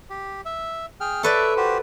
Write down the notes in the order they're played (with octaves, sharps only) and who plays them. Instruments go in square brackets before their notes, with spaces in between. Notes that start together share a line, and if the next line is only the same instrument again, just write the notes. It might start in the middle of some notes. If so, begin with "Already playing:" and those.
[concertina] G4
E5
G#4 G5 F6
[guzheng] A4 B4 D5 [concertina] C#5 E5
[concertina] F#4 G4 C5